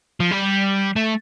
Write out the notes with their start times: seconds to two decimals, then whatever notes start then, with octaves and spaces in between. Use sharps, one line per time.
0.20 F3
0.31 G3
0.96 A3